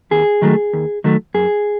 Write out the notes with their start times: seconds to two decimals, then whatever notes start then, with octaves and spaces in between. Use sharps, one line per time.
0.11 D#2 G#4
0.42 D#3 F#3 A3
0.73 D#2
1.04 D#3 F#3 A3
1.34 F#2 G#4